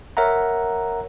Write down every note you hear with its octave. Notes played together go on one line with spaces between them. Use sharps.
A#4 C#5 E5 F#5 A#5